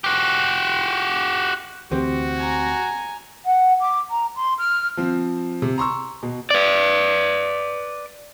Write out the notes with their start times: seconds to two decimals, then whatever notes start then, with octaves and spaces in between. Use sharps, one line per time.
0.04 F#4 G4
1.92 D2 E3 C4 F#4 G4
2.38 G#5 A#5
3.45 F#5
3.81 D6
4.10 A#5
4.36 C6
4.58 F6
4.97 F3 C4
5.62 C3
5.78 A#5 C6 C#6 E6
6.23 B2
6.51 B4 D5